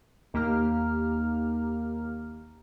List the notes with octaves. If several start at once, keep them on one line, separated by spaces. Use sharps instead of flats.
D#2 A#3 G4 A#5 F6